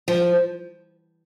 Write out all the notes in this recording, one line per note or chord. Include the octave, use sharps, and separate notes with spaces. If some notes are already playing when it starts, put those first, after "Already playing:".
F3